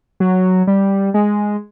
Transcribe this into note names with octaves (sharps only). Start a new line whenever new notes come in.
F#3
G3
G#3